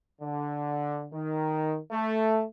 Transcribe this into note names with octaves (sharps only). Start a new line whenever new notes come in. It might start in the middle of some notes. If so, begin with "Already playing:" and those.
D3
D#3
A3